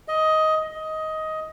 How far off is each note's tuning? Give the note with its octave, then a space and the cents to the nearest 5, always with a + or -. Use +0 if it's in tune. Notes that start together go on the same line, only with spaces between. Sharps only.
D#5 +15
D#5 +15